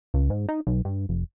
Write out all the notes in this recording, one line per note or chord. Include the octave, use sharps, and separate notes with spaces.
C#2
G#2
D#4
B1
G2
F1